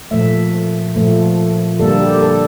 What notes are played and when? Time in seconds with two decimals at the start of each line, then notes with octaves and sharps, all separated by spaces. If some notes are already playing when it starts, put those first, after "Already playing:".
0.11 A#2 F3 A3 E5
0.96 A#2 F3 A3
1.79 D3 G3 A#3 A4
2.00 G4
2.22 A4